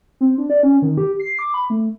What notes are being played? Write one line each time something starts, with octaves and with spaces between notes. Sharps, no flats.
C4
D4
D5
C#4
D#3
G4
C7
D6
B5
A3